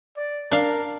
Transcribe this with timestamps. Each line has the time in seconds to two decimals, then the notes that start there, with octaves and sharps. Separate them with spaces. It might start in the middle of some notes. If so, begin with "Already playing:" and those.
0.17 D5
0.51 D4 A#4 F5